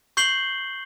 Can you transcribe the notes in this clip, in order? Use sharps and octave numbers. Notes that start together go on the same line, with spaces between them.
C#6 G6 C7 F#7 G7